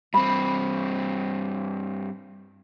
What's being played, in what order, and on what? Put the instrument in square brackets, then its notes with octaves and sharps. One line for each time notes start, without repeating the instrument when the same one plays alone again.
[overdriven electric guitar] G2 C4 [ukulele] B5